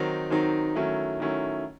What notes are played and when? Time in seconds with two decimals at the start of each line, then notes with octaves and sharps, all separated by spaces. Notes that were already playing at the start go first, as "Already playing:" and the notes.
Already playing: D#3 F#3 C4 D#4
0.30 D#3 F#3 C4 D#4
0.76 D#3 F#3 A3 C#4 E4
1.20 D#3 F#3 A3 C#4 E4